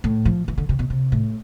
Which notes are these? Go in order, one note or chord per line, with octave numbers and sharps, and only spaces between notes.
A2
F3
E3
D3
C3
B2
C3
A2